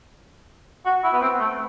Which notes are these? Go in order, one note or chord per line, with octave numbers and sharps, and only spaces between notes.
F#4
E4
B3
C4
A3